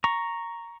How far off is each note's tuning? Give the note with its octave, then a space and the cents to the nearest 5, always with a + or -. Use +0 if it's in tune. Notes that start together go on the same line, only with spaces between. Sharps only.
A#5 +0 C#6 +0